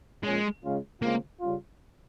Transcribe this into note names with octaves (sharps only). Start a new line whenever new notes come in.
A#2 F3 G#3 A#3 C#4
C#3 G#3 C#4 F4
C#3 G#3 A#3 C4 F4
C#3 G3 C#4 F4